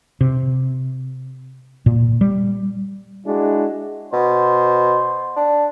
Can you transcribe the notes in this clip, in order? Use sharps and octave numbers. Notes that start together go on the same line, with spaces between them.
C3
A#2
G3
G#3 D4 E4 F#4 G#4
B2 C5
D4